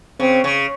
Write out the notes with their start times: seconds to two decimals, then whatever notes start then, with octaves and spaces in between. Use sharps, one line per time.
0.20 C#3 C4
0.44 C#3